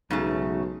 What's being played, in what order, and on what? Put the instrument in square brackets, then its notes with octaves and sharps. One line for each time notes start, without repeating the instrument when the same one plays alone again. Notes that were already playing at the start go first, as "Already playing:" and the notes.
[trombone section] B1 [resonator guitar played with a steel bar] G#2 C#3 A3